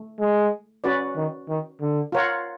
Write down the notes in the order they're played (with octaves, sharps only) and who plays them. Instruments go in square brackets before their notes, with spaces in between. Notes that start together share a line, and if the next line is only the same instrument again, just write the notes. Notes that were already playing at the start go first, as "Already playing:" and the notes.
Already playing: [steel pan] A3
[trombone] G#3
[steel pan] C#4 F#4 B4 D5
[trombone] D#3
D#3
D3
[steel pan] F4 A#4 C#5 F#5